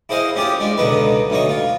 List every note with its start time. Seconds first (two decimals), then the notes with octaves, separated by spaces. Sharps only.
0.09 E4 G#4 C5 D#5 F5
0.36 C#4 F4 G4 G#4
0.60 G#3 D4
0.77 C#2 B2 D3 D#4 B4
1.30 D2 B2 D#4 C#5 C#6
1.49 F4